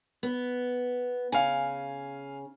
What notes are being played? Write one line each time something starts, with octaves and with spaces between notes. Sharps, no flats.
B3
C#3 F5 G#5